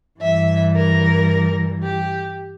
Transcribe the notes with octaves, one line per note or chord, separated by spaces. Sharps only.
G2 E3 G3 E5
A#4
G4